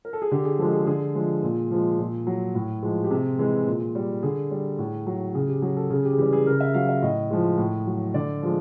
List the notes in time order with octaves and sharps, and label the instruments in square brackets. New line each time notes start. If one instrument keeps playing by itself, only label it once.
[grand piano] A#4
A4
G#4
D3 G4
G#4
F3 G#3 A4
G#4
D3 G#4
F3 G#3
A#2
F3 G#3
A#2
F#3
A2
F3 G#3
G4
C3 G#4
E3 G#3
A#2
G3
D3 G#4
G3
A2
F#3
C#3 G#4
G4
F#3 G#4
A4
C#3 G#4
G4
G#4
E3 G3 G4
G#4
C#3 A#4
E5
F#3 F5
E5
A2 D#5
F3 G#3
A2
F#3
D3 D5
F3 G#3